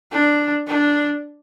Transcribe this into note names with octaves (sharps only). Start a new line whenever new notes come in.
D4
D4